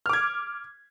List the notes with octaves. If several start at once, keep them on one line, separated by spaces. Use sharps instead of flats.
D6 F6 G#6